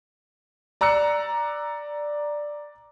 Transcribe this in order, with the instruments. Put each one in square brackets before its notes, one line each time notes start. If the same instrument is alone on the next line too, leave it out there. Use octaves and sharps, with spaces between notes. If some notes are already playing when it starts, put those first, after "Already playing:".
[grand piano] D5 A#5 E6 F#6 C#7